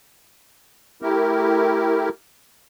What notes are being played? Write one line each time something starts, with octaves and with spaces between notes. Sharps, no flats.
A3 E4 G4 A#4